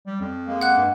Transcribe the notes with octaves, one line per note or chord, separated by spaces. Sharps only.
G3
F2
G#3 A#3
F#5 F#6
G2